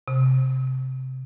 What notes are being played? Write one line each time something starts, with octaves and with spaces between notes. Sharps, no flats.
C3